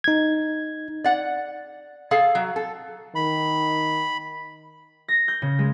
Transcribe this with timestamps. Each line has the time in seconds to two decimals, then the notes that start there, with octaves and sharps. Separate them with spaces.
0.04 D#4 G#6
1.04 D5 F#5
2.11 G#4 A4 F5
2.35 F#3
2.56 A4
3.15 D#3 B5
5.08 A#6
5.28 G6
5.42 C#3
5.59 G#3